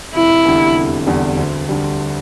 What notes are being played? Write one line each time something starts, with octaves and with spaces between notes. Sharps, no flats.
F1 E4
E2 D3 G3
F1
E2 D3 G3
D2
D3 G3